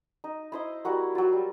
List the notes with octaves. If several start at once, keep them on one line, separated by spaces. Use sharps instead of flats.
D#4
E4 C5 D#5
G3 E4 F#4 A#4
F#3 F4
G3